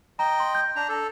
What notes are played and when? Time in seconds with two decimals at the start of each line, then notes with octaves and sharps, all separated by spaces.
0.19 D#5 G5 A#5
0.40 C6
0.55 G6
0.76 D4 A#5
0.89 A4